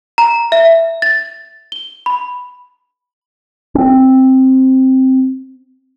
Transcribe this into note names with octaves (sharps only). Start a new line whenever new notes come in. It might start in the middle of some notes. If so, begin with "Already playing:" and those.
A#5
E5
A6
G7
B5
C4 C#4